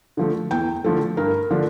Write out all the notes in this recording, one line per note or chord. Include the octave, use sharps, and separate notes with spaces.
D3 F3 A3
E2 G5
D3 F3 A3
G2 A#4
D3 F3 A3 D4